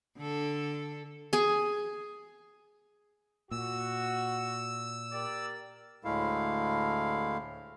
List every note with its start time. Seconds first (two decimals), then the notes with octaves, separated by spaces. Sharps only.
0.18 D3 A4
1.33 G#4 G#5
3.51 A#2 F#4 E6
5.12 G4 A#4 D5
6.04 D2 A2 G#3 A3 E4 F5